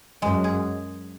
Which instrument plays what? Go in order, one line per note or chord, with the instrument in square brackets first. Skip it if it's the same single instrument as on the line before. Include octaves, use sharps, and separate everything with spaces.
[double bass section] F#2 [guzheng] G#3
[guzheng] G#4